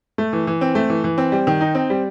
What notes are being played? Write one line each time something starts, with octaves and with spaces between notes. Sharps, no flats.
A3
E3
E3
C4
A3
E3
E3
C4
G3
D#3
D#4
C4
G3